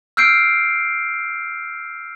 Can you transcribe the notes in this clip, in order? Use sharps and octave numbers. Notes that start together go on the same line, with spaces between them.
E6 F6 G6 C7 D7